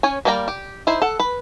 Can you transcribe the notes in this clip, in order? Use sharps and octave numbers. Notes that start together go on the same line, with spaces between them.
C#4 C#5 G#5
G3 A#3 D5 G5 A#5
G4
D#4 E4 C5
A4 F#5
B4